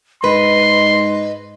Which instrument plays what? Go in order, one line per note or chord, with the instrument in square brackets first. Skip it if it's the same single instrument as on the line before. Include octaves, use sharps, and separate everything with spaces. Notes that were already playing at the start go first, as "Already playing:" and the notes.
[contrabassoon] G#2 [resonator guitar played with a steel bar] B4 [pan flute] D#5 [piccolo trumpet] C6